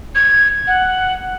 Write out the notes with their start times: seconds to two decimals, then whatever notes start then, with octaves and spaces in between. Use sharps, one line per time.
0.15 G#6
0.67 F#5